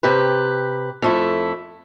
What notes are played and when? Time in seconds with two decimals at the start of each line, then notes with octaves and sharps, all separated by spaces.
0.03 C3 G4 B4
1.02 F2 A3 E4